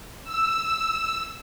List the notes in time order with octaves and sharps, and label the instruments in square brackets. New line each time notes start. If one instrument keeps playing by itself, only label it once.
[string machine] E6